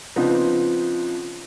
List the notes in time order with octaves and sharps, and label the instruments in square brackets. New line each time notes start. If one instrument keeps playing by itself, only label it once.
[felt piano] C#3 F3 B3 C4 D4 D#4